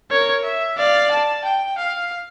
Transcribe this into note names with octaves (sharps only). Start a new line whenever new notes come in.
A#4 C#5
E5
D5 F5
A5
G5
F5